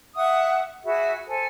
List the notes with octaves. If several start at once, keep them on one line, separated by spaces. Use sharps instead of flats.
E5 F#5 C#6 D#6
F#4 G#4 E5 B5
A4 C5 G#5